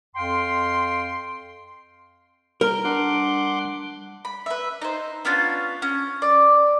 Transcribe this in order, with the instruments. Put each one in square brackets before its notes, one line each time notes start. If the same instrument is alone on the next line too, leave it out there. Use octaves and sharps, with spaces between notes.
[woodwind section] F2 F5 G5 C6
[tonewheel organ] G3 [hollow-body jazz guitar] A#4
[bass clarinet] D4 [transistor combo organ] F#5 C6 D6
[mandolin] B5
B4 E5
D#4 C5
B3 C#4 D4 F4
C#4
D5